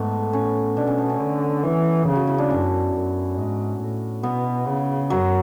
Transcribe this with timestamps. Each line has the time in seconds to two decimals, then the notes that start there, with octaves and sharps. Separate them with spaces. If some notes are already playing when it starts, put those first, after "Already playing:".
Already playing: G#2 A3 B3
0.33 A2 C#4
0.76 B2 D4
0.87 C#4
0.98 B3
1.09 C#4
1.20 D3
1.64 E3
2.07 C#3
2.16 F#4
2.27 E4
2.38 D4
2.50 F#2 C#4
2.93 F#2
3.37 G#2
3.80 A2
4.23 B2 B3
4.67 C#3
5.10 F#2 F#3